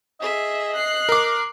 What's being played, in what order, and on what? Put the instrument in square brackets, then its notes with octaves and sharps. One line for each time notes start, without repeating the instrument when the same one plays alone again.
[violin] G#4 E5 [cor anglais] D#5
[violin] F#6 C7
[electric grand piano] A#4 D6